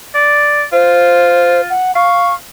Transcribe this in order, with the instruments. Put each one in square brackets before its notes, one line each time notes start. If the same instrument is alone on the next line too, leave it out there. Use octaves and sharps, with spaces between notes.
[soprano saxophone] D5
[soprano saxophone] F4 [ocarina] C5
[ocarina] F#5
[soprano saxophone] F5 [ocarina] C#6